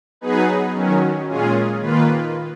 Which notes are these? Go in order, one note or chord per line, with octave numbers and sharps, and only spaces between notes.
F#3 B3 D#4 G#4 B4
D#3 F#3 C#4
A#2 G#3 C#4 F4 G#4
D#3 A#3 F4 B4